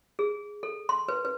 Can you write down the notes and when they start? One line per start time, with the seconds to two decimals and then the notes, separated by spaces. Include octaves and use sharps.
0.19 G#4
0.63 A4
0.89 C6
1.08 B4
1.25 B4